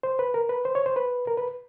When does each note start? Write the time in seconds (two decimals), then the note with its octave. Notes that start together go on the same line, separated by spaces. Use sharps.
0.03 C5
0.19 B4
0.34 A#4
0.49 B4
0.65 C5
0.75 C#5
0.86 C5
0.96 B4
1.27 A#4
1.37 B4